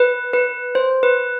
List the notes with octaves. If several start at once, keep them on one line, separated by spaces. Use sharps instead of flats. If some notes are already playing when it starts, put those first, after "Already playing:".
Already playing: B4
B4
C5
B4